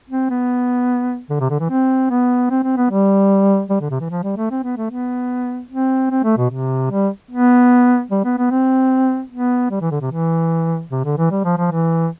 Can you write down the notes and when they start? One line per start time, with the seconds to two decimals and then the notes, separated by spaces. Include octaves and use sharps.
0.10 C4
0.30 B3
1.30 D3
1.40 C3
1.50 D3
1.60 E3
1.70 C4
2.10 B3
2.50 C4
2.64 C4
2.77 B3
2.90 G3
3.70 G3
3.80 D3
3.90 C3
4.00 E3
4.10 F3
4.23 G3
4.37 A3
4.51 C4
4.63 B3
4.77 A3
4.90 B3
5.70 C4
6.11 C4
6.24 A3
6.37 B2
6.50 C3
6.91 G3
7.31 B3
8.11 G3
8.24 B3
8.38 B3
8.51 C4
9.31 B3
9.71 G3
9.81 E3
9.91 D3
10.01 C3
10.11 E3
10.91 C3
11.05 D3
11.18 E3
11.31 G3
11.44 F3
11.57 F3
11.71 E3